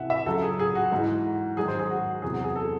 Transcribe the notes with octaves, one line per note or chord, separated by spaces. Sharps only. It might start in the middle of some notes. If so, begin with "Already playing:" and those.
Already playing: C2 C3 E3 E5 F#5
E5
C#2 C#3 F#3 A4
G#4
G#4
F#4
G#2 E3
G#2 D#3 F#3 G#4
C5
G#4
F#4
E2 C3 F#3 G#4
F#4
G#4
A4